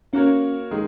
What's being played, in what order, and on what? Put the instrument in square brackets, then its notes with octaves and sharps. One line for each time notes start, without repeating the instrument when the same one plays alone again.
[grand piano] A#3 F#4 A#4 C#5 [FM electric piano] C#4
[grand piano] D#3 G#3 D#4